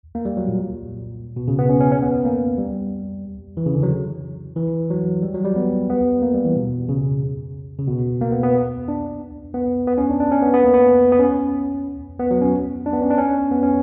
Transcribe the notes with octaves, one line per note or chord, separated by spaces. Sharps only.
A#3
G3
F#3
A#2
B2
C#3
B3
C#4
C#4
C#4
B3
A#3
G3
E3
C#3
D3
F#3
E3
F#3
G3
F#3
G3
B3
B3
A#3
G3
E3
B2
C#3
C#3
B2
A#3
B3
B3
D4
B3
B3
C#4
D4
D4
C#4
B3
B3
A#3
B3
B3
C#4
B3
F#3
C#4
D4
B3
C#4
D4
C#4
B3
C#4